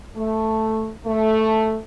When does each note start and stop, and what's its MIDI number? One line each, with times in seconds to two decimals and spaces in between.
0.17 0.91 57
1.05 1.76 57